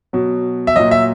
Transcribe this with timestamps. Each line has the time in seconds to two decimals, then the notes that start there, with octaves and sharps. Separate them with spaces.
0.13 B2 F#3
0.67 E5
0.76 A#2 F#3 D#5
0.91 E5